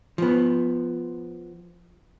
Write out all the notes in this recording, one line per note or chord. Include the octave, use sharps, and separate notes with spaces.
F3 B3